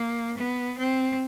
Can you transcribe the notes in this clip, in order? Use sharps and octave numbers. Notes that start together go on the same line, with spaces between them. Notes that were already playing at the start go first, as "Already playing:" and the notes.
Already playing: A#3
B3
C4